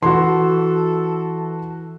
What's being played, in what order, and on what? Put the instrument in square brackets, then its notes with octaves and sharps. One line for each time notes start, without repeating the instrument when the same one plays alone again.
[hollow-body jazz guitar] E3 [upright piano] F#4 C6 [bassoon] A4